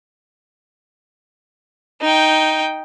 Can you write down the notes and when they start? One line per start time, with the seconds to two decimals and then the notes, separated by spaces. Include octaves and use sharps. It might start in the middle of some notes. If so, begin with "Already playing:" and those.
2.01 D#4 G5